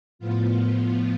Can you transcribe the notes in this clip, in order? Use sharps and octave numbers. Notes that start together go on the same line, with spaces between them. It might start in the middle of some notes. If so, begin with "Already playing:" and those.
A2 F3 B3 F4